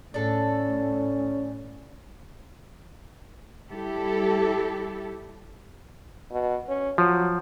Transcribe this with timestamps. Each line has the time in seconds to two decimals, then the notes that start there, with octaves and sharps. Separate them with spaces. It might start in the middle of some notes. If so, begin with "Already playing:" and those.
0.14 A2 C#4 D4 A4
3.70 G3 E4 G4 A4
6.31 B2
6.69 C#4
6.98 F3 F#3